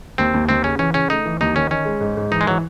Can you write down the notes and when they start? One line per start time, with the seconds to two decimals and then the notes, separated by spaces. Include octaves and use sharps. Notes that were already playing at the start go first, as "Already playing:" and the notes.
0.18 D#2 C4
0.34 D#2
0.49 D#2 C4
0.64 C#3 C#4
0.79 E3 C#4
0.94 C#3 C#4
1.10 A3 D#4
1.25 E3
1.41 D#2 D#4
1.56 D#3 C#4
1.70 D#3 C#4
1.85 G#3
2.01 G#2
2.17 G#2
2.31 E3 D#4
2.41 G#3
2.47 E3 F#3